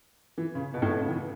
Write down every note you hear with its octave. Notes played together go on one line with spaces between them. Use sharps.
E3
C#3
B2
A2
B2
C#3
E3